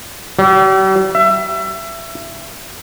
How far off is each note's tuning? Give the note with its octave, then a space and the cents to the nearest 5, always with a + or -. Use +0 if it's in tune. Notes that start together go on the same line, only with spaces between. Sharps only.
G3 -45
E5 +25